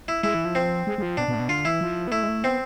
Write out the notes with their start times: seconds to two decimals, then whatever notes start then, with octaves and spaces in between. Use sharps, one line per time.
0.08 E4
0.23 G#3 E4
0.34 E3
0.45 F3
0.55 C4
0.87 G#3
0.98 G#3
1.02 F3
1.17 B2 D4
1.28 B2
1.35 A2
1.39 B2
1.49 D3 F4
1.65 E3 E4
1.81 F3
2.08 B3
2.12 A3 E4
2.23 G#3
2.28 A3
2.44 B3 C4